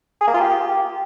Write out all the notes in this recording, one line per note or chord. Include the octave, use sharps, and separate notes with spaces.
G#4
A#3
F4
G4